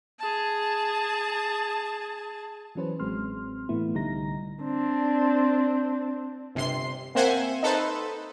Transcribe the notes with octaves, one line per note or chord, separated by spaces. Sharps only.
G#4 A5
E3 F#3 C#4 B4 C5
A1 F#3 G#3 C4 C6 F6
A2 E3 A3 B3 E4
C2 D3 G3 D#4 A#5 A#6
C4 D4
G1 C3 C6 C7
A#3 C4 C5 E5 F#5 G#5
D#4 A4 B4 C5